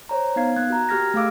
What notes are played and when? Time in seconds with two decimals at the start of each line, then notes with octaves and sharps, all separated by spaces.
0.09 C5 C#5 A#5
0.36 B3 D#4 F5 G#6 C7
0.56 A#3 F#6 G#6
0.70 F#4 A#5
0.89 A#3 G4 F6 G#6 A#6
1.14 A3 G#4 F5 D6 E6